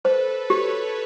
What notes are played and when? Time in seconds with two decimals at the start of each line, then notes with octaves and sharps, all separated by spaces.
0.05 A4 B4 C5
0.50 G4 B4 C#5